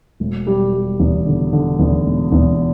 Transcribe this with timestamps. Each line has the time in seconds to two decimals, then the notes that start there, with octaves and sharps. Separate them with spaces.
0.20 E1
0.47 G3
0.73 G3
1.00 E2
1.26 D3
1.53 D3
1.79 E2
2.06 E1
2.32 E2